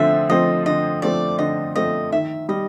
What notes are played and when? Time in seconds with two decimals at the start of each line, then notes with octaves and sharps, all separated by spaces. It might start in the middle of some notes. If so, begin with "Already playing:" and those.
Already playing: D3 F3 A3 C4 E5
0.29 F3 A3 C4 D#5
0.66 D3 D#5
1.02 F3 A3 C4 D5
1.39 D3 D#5
1.75 F3 A3 C4 D#5
2.12 D#3 E5
2.49 G3 D#5